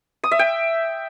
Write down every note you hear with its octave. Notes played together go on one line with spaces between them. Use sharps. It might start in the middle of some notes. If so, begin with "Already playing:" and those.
D#6
E5
G5